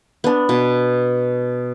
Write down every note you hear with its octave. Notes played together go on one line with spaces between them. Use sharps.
B3 D4
B2